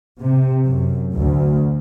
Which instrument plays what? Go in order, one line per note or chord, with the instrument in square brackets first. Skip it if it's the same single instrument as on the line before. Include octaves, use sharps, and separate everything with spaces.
[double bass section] C3
F#2
D2